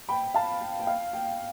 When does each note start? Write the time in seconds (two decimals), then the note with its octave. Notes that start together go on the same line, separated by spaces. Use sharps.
0.09 G5 B5
0.34 F5 A5
0.61 G5
0.79 G5
0.87 F5
1.13 G5